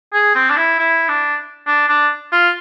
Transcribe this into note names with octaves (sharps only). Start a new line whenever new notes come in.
G#4
C4
D4
E4
E4
D4
D4
D4
F4